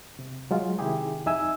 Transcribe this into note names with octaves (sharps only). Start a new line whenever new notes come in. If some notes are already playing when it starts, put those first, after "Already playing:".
C3
F#3 G#3 F4
C3 D#3 E4 G4 G#4
F2 D#4 E5 G#5 E6